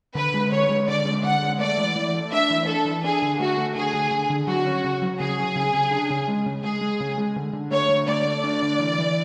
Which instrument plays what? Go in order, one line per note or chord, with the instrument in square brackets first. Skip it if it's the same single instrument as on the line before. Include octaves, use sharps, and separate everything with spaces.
[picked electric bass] D3 [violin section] B4
[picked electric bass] G#3
[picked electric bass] D3 [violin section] C#5
[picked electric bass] G#3
[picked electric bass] D3 [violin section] D5
[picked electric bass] G#3
[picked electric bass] D3 [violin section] F#5
[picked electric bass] G#3
[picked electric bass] A3 [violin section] D5
[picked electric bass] E3
E3
A3
[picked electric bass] D4 [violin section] E5
[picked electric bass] E3
[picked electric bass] D4 [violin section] A4
[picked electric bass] E3
[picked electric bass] D4 [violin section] G#4
[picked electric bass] D3
[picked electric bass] A3 [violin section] F#4
[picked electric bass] A3
[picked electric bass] D3 [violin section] G#4
[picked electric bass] D3
D3
D3
[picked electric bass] F#3 [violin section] F#4
[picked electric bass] C#4
C#3
F#3
[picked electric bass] C#3 [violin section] G#4
[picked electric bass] F#3
C#3
C#3
D4
C#3
G#3
C#3
[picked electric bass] G#3 [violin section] G#4
[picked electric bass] G#3
C#3
G#3
D3
D3
[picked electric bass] A3 [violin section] C#5
[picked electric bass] D3
[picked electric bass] A3 [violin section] D5
[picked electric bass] A3
D4
D3
E3
E3